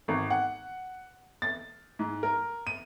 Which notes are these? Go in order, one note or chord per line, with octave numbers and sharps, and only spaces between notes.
G#1
F#5
A6
G#2
A#4
D#7